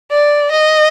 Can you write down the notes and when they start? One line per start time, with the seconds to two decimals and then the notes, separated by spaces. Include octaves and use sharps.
0.12 D5
0.52 D#5